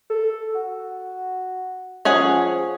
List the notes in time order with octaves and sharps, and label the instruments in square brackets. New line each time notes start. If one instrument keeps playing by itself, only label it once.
[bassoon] A4
F#4
[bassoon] F3 [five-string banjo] C#4 G#4 F#5